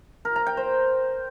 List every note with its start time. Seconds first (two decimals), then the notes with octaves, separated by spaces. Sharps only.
0.25 A#4
0.36 A#5
0.47 G5
0.57 C5